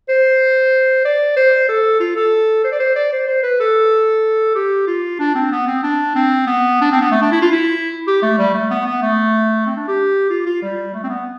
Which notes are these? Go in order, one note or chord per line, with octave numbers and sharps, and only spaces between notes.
C5
D5
C5
A4
F4
A4
C5
D5
C5
D5
C5
C5
B4
A4
G4
F4
D4
C4
B3
C4
D4
C4
B3
D4
C4
B3
A3
D4
E4
F4
E4
G4
A3
G3
A3
B3
B3
A3
C4
D4
G4
F4
F4
G3
A3
C4
B3